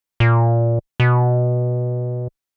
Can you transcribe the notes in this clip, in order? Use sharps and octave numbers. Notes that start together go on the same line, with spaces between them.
A#2
B2